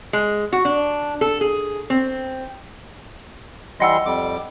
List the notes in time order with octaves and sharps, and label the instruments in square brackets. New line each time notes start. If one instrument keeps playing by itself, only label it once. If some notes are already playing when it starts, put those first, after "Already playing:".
[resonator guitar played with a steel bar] G#3
F#4
D4
A4
G#4
C4
[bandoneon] E3 G3 C6 [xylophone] D#5 F#5 E6
[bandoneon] F2 G3 D6